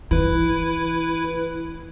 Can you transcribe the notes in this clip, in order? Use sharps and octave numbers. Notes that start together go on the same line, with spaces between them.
E3 E4 B4